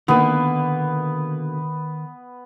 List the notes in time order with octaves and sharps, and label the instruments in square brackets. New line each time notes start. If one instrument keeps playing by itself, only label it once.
[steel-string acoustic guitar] B2 D3 A#3 [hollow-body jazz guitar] D#3 [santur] B3 B4